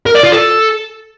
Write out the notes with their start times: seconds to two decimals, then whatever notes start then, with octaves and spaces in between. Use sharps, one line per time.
0.06 A#4
0.15 D5
0.23 F4
0.32 A4